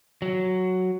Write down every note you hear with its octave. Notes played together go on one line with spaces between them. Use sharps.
F#3